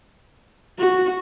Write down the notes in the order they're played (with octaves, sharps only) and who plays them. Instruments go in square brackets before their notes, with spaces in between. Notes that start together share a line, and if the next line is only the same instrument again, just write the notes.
[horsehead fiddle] F#4